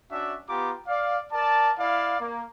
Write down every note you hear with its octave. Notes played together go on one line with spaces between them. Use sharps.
C#4 D4 F#4 E5
B3 F4 G4 A#5 D6
D5 F5
A#4 D5 A5
E4 D5 F5
A#3